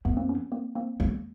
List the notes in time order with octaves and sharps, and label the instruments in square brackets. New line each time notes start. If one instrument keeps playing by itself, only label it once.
[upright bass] F2 [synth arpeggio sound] A3 B3
[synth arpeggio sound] A#3 C4
B3 C#4
A#3 C4
A#3 C4
[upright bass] E2 [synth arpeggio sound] G#3 A#3